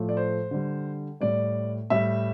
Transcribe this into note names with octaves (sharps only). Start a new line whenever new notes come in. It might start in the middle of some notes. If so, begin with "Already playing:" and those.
Already playing: A2 F3 A3
D5
C5
D3 G3
A2 G3 D5
A2 G3 E5